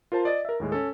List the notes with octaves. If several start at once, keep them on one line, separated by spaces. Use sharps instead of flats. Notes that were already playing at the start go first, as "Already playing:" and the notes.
F4 A#4 C5 A5
D5 D#5 A6
A#4 E5
D#2 A2 G#3
C#4 A4